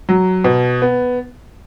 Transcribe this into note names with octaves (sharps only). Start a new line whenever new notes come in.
F#3
B2
B3